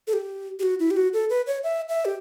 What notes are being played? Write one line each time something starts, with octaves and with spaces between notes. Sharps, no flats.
A4
G4
G4
F#4
E4
G4
F#4
A4
B4
C#5
E5
E5
G4